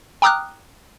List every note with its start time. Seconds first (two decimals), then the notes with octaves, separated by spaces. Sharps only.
0.22 G5 A#5 D6 D#6 F6 F#6